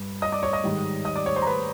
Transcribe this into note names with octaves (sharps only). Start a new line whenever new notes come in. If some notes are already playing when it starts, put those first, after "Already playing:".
Already playing: G2
D#5 D#6
D5 D6
C#5 C#6
D#5 D#6
G#2 D#3 G3
D#5 D#6
D5 D6
C#5 C#6
C5 C6
A#5
B4 B5